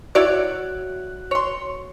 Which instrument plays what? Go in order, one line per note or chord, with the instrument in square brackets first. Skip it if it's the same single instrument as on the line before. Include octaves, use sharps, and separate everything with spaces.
[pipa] E4 C#5 D5 [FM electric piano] F#4 F#6
[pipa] C#5 C6